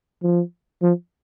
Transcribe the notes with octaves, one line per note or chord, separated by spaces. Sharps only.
F3
F3